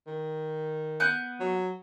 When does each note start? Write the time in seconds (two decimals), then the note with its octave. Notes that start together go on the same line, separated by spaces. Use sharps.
0.07 D#3
1.00 B3 F#6 G6
1.40 F#3